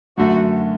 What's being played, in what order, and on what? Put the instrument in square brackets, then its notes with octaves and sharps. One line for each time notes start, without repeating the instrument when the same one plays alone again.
[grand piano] F#2 D3 A3 [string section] F#4